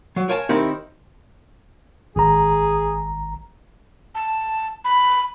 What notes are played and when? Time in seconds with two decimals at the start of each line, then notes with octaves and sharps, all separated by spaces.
0.16 F#3
0.29 A#4 C#5 F5 G#5 A5
0.49 D#3 C4 D#4 E4 G4 A#4
2.16 G#1 G#4 A#5
4.15 A5
4.85 B5